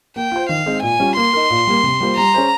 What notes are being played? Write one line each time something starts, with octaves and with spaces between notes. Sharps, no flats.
A#3 G5
F4 C5
D#3 F5
G#3 C4 D#4
A#2 G#5
G3 C#4 F4
A#3 C6
D#4 A#4
A#2
G3 A#3
C3
G3 A#3 F4 C5
G3 A#5
C#4 G#4 C5